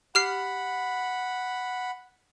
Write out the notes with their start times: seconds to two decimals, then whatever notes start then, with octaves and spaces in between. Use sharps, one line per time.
0.15 G4 F#5 B5 F6 C7